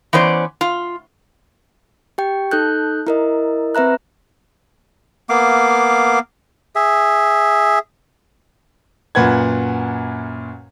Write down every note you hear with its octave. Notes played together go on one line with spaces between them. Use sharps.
E3 B3 C#4 C5 D5
F4
G4 G5
D#4 A4 F#6 G6
E4 A#4 D#5
C4 B4 E5 A#5 F#6
A#3 B3 F5 D6
G#4 E5
F#2 A#2 B4 F#5 G#6